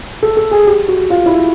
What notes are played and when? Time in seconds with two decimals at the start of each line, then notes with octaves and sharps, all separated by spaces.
0.23 A4
0.37 A4
0.51 G#4
0.67 G4
0.88 F#4
1.10 F4
1.26 E4